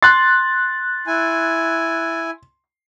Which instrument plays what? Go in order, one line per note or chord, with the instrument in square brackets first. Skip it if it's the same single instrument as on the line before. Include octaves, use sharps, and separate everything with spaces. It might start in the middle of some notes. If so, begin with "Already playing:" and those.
[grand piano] C6 [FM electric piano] F#6 A6
[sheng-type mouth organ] E4 G#5